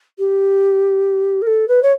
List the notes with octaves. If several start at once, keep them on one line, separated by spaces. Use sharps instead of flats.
G4
A#4
A4
B4
C#5